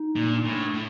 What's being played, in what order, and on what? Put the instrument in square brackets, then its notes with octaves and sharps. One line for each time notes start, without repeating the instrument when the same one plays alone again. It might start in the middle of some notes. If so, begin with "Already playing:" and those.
Already playing: [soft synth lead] D#4
[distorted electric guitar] A#2
[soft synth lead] D4
[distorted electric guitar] A2
A2